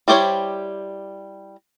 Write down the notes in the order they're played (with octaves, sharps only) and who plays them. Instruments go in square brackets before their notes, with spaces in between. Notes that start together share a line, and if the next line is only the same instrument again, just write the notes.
[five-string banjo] G3 E4 G4 C5 C#5